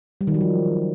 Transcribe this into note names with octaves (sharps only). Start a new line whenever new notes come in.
G3
D#3
F#3
F3